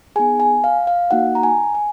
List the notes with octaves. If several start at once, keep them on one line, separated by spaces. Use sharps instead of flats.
B3 D#4 G#4 G#5
G#5
F5
F5
A#3 D#4 F#4 F#5
A#5
G#5
G#5